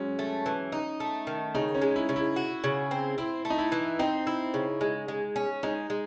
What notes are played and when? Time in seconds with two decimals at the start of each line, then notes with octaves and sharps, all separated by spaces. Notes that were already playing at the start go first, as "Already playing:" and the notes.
Already playing: F#3 G#3 C#4
0.19 A3
0.46 E3
0.72 D#4
1.00 A3
1.27 D#3
1.55 C#3 D#4
1.75 C#4
1.81 G#3
1.96 E4
2.09 C#3
2.16 E4
2.36 F#4
2.64 C#3
2.91 C4
3.18 C4 E4
3.45 A3
3.50 D#4
3.58 E4
3.72 E3
3.99 C4 D#4
4.27 E4
4.54 C#3
4.81 G#3
5.08 G#3
5.36 C#4
5.63 G#3 D#4
5.90 G#3